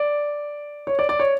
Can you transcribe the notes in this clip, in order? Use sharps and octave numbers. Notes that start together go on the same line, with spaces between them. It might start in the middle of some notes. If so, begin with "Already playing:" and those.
Already playing: D5
C#5
D5
D5
C#5